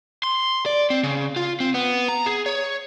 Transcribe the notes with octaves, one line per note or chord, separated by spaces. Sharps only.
C6
D5
C4
C#3
F4
C4
B3
A#5
G#4
C#5